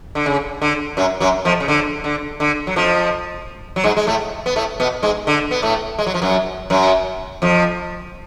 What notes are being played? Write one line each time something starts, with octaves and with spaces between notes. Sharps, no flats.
D3
C#3
D3
F#2 F#3
F#2 F#3
F2 F3
C#3
D3
D3
D3
F#3
F2 F3
F#3
G#2 G#3
G#3
A2 A3
B3
A2 A3
B2 B3
G#2 G#3
D3
B3
A2 A3
G#3
F#3
F3
F#2 F#3
F#2 F#3
F2 F3